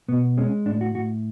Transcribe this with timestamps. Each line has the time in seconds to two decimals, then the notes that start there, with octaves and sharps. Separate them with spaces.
0.08 B2 B3
0.37 G#3 C#4
0.66 A2 D4
0.81 F#4
0.95 A2 F#4